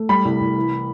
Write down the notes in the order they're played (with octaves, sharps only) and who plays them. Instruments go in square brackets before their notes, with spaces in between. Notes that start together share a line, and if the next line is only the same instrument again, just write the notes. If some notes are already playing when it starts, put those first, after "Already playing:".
Already playing: [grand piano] A3
G3 B5
C2
C2
E3